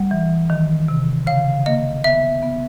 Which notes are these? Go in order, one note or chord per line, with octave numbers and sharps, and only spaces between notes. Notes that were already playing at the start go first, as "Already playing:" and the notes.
Already playing: G3 F#5
E3
D#3
C3
C#3 F5
A#3 D#5
B3 E5
B3